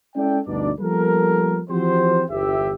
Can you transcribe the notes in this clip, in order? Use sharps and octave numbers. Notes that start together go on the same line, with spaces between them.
G#3 C#4 E4 A4 D5 G5
D2 G2 B2 D4 D#4 D5
F3 G3 A#3 B3 A4 A#4
E3 F3 C4 F#4 G4 C5
G1 E2 G4 E5